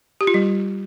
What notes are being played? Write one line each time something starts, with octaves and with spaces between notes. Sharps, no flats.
G4
F4
G3